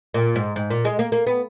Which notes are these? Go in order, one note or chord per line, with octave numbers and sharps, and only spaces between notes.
A#2
G#2
G#2
A#2
G#3
A#3
A#3
B3